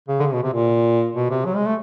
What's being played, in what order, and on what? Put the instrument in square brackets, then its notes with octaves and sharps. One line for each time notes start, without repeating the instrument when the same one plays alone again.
[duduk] C#3
D3
C#3
B2
C3
A#2
B2
C3
F#3
G#3
A3